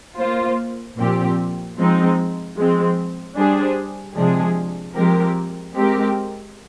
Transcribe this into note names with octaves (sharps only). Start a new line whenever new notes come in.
A#3 F4 C5
A#2 F3 C4 G4
F3 G#3 C4 D#4
F3 G#3 C4
G3 D4 G#4 C5
C3 F3 G#3 D4 G#4
F3 G#3 C4 G4 A#4
G#3 C4 G4 A#4